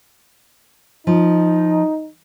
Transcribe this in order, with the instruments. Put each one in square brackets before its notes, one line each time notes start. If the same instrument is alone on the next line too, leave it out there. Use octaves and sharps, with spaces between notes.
[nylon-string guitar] F3 [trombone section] D#4